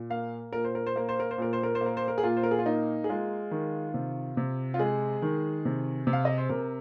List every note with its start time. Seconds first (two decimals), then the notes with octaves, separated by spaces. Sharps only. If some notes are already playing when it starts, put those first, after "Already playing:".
Already playing: A#2
0.10 A#3 F5
0.53 A#2 A#4
0.64 C5
0.75 A#4
0.87 C5
0.96 A#3 A#4
1.09 C5
1.20 A#4
1.31 C5
1.38 A#2 A#4
1.53 C5
1.63 A#4
1.75 C5
1.81 A#3
1.86 A#4
1.97 C5
2.08 A#4
2.18 G#4
2.23 A#2 F4
2.37 C5
2.43 A#4
2.51 G#4
2.59 F4
2.66 A#3 D#4
3.04 G#4
3.09 G#3 F4
3.51 D#3
3.94 C3
4.37 C3
4.74 F4
4.79 G#3 G#4
5.22 D#3
5.65 C3
6.07 C3
6.13 F5
6.25 D#5
6.38 C5
6.49 C3 A#4